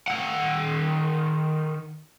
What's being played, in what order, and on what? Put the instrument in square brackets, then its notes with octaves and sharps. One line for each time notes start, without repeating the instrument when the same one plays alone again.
[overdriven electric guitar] D#3 F#5